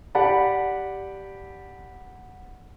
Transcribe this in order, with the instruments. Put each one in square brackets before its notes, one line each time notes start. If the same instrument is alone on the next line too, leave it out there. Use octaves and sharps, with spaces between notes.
[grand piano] G4 D5 F#5 A5 B5